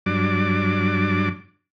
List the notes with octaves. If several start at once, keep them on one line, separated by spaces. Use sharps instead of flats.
G2 F#3 D4 D6